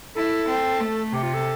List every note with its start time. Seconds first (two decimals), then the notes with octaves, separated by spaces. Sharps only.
0.15 E4 A4
0.48 C4
0.80 A3
1.12 C3 G4
1.23 F4
1.34 A4